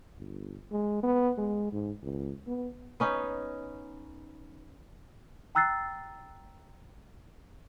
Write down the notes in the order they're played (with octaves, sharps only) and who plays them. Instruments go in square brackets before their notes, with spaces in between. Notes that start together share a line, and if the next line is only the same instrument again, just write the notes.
[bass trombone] G1
G#3
B3
G#3
G#2
C#2
B3
[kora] B3 C#4 D#4
[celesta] G5 A#5 E6 F#6 A6 C7